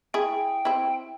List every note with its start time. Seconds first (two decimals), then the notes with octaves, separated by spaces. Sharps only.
0.14 E4 G#4 G5
0.65 C4 E4